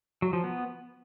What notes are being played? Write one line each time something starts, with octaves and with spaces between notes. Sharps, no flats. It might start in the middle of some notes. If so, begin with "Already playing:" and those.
F#3
F3
B3